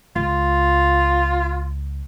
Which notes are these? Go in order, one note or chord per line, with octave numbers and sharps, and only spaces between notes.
C#2 F4